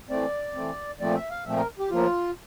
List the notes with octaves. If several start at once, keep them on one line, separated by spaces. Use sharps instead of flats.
E3 A3 C4 D5
E3 A3 C4
A#2 F3 A3 C4 D5
E5
F5
A#2 F3 A3 C4 E5
A#4
G4
A2 F3 A#3 F4